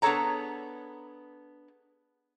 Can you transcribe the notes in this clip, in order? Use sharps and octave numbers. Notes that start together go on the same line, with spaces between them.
B3 D4 G#4 A4 C#5 A#5